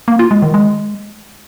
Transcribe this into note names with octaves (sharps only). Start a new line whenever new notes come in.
A#3
F4
G#3
D#3
G#3